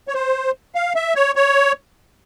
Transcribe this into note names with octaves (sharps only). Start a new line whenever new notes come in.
C#5
C5
F5
E5
C#5
C#5